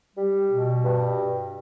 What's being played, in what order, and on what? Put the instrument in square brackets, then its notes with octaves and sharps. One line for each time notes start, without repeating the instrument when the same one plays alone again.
[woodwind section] G3
B2
G2